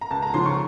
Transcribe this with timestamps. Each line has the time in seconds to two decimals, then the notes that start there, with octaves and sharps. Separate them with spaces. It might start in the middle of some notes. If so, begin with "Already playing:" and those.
0.01 A#5
0.11 C#2 A5
0.22 A#5
0.34 C#3 F3 C6
0.46 C#6